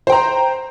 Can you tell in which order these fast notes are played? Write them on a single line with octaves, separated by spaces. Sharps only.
C5 G5 A#5